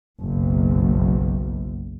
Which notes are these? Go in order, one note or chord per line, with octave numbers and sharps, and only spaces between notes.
F#1 B1